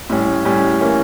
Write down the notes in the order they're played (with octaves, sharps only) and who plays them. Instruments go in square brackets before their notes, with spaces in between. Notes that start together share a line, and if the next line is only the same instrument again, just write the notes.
[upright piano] A2 G3 C#4
A2 G3 C#4
E3 A#3 C#4